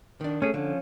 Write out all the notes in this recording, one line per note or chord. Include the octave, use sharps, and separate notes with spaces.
D#3 D4
A3 C#4 G#4
D3 F3 C#4